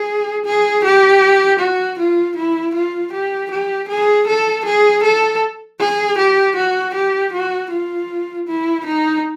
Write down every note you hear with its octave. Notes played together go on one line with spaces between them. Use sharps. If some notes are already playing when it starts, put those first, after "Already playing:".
Already playing: G#4
G#4
G4
F#4
F4
E4
F4
G4
G4
G#4
A4
G#4
A4
G#4
G4
F#4
G4
F#4
F4
E4
D#4